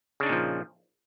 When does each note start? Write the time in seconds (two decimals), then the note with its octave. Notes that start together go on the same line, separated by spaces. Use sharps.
0.20 C#3
0.23 D4
0.26 D#4
0.29 A#2
0.32 F3